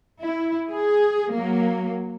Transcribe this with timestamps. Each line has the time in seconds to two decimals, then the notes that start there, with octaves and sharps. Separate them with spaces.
0.21 E4
0.71 G#4
1.35 F#3 A#3